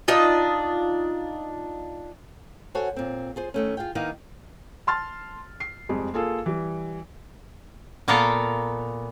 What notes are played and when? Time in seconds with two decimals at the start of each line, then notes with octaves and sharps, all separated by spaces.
0.08 D4 D#4 F4 D#5
2.75 F#4 A4 C5 C#5 F#5 G#5
2.96 A#2 C4
3.36 F4 G#4 C5
3.54 D#3 A3 C#4
3.77 F4 G#4 F5 G5
3.95 D#3 A#3 B3 D#4 E4 F5
4.87 A5 C6 F6 A6
5.60 C7
5.89 F2 G3 G#3
6.14 A#3 F4 G#4 A4
6.46 E3 G3
8.08 A#2 A#3 B3 A4 A#4 F5